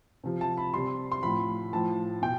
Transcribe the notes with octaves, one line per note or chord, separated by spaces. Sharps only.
C3 F3
A5
B5
C3 G3 C6
C6
A2 F3 B5
A2 F3 A5
B2 G5